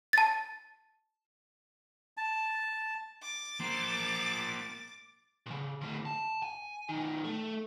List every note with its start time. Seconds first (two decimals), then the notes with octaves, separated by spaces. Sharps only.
0.13 A5 A6
2.17 A5
3.22 D6 A6
3.60 A#3 C5
5.46 A#2 C#3
5.81 A2 D3
6.05 A5
6.43 G#5
6.89 B1 D#3
7.24 A3